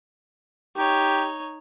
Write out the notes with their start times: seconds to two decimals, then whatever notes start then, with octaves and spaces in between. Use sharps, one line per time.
0.77 D#4 G4 C#5